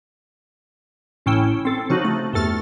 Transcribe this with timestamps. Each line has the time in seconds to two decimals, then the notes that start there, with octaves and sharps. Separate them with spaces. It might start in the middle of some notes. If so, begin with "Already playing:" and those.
1.26 A1 A2 C#4 E4 G5
1.65 C4 A4
1.90 C#3 F3 D#4 F#4
2.05 A3
2.33 E2 G2 A3 A4 F6 A6